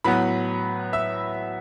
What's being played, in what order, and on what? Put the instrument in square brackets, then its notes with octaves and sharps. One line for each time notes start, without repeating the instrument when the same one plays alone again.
[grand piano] A2 F#3 B3 B4 B5
E5 E6